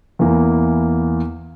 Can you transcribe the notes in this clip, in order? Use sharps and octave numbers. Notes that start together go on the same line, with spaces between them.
E2 E3 A#3